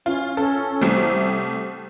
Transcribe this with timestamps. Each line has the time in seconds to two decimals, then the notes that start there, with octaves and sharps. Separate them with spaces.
0.06 C#4 F4
0.37 C#4 A4
0.81 C2 A3 C4